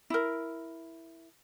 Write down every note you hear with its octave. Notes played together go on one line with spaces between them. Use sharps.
E4 A#4